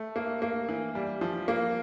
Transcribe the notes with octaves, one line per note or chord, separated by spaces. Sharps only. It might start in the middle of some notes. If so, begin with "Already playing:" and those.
Already playing: A3
A#3
A#3
E3
G3
F3
A#3